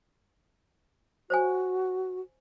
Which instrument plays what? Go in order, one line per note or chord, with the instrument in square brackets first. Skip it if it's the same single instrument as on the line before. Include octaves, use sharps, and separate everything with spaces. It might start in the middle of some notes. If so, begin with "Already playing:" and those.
[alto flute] F#4 [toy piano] C5 C#5 G#5